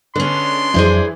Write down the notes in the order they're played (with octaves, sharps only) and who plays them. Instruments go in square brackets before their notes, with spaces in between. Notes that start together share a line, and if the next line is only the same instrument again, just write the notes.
[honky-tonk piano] D3 [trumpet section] G#3 D4 C6 [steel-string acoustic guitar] B3 C#4
[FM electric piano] F2 F#3 [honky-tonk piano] E3 [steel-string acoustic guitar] G#4 C5 D5